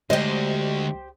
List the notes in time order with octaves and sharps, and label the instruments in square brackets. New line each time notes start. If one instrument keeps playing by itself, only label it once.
[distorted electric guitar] D2 [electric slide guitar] G#3 D5 [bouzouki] G4 C5 [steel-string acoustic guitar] D#5